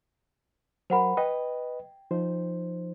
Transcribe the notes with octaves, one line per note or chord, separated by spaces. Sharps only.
F#3 A#4 C5 F#5 B5
B4 D#5 G5
F3 D#4 C5